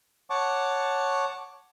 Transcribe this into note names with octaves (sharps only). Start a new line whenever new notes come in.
C#5 F#5 A5 C#6 D6